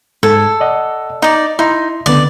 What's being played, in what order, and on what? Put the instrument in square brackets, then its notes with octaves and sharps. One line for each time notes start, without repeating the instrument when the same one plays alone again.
[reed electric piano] G#2 G#6 [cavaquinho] A4
[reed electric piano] D5 D#5 F#5
[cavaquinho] D#4 D5 [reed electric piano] D#5
[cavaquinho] D#4 [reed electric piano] E4 C6
[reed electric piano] C#2 D3 B3 [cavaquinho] D5